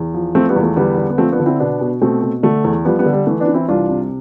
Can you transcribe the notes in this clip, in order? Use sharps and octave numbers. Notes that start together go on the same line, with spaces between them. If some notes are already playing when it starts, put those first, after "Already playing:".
Already playing: E2
F3
F3 A3 C4
G3 B3
E2
A3
D3 G3 B3
D3
B3
F3 A3 C4
B3 D4
D3
C4 E4
B2 B3 D4
B2
B2 A3 C4
B2
D3 A3
E2
F3 G3 B3
G3 B3
D3
G3
E3 A3
B3 D4
E3
C4 E4
C2 D4 F4
C3